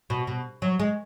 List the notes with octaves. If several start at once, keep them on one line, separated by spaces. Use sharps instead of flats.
B2
B2
F#3
G#3